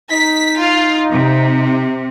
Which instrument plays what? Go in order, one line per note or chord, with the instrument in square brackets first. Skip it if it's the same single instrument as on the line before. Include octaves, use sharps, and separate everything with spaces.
[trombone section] D#4 [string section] B6
[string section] F4
C3